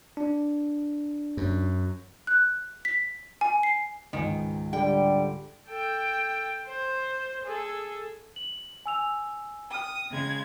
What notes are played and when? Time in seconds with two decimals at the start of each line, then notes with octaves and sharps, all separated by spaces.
0.17 D4
1.37 F#2
2.27 F#6
2.85 B6
3.41 G#5
3.63 C7
4.13 C#2 G#2 D#3 G#5
4.73 D3 G3 G5
5.68 A4 G5
6.68 C5
7.45 G#4 A4
8.36 F#7
8.86 G#5 E6 F7
9.71 G5 D#6 F6
10.10 C#3 G#3 G#6